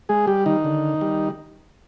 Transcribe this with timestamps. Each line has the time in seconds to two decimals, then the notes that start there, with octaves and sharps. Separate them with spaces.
0.09 G#3 G#4
0.27 G3 G4
0.46 D#3 D#4
0.64 D3
1.01 G3